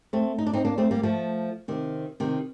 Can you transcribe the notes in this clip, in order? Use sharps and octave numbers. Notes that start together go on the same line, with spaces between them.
A3 C4
D#4
D4
C4 D#4
A#3 D4
A3 C4
G3 A#3
F3 A3
C3 D#3
C3 D#3